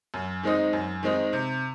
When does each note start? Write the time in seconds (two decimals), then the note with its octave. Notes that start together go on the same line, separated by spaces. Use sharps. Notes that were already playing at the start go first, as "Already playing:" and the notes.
0.14 F#2
0.43 D#3 G#3 C4 D#4
0.73 F#2
1.03 D#3 G#3 C4 D#4
1.33 C3